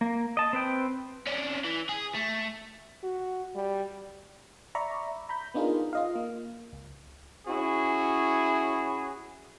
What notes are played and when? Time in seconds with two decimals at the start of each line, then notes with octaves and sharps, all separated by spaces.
0.01 A#3
0.37 D#5 A5
0.53 C4 B4 G5
1.27 C#4 D4
1.64 E3
1.89 G#4
2.15 A3
3.03 F#4
3.55 G3
4.75 D5 E5 A#5 B5 C#6
5.29 A#5 B5 G6
5.54 B3 D4 D#4 F4 G#4 A#4
5.93 F4 D#5 F5
6.15 A#3
6.73 C#2
7.47 C#4 E4 F#4 G#4